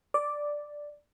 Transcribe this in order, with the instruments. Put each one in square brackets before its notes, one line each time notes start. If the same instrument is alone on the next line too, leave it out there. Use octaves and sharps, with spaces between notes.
[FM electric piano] D5